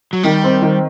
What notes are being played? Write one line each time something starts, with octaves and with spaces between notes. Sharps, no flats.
F#3
D#3 G3
C4
D#3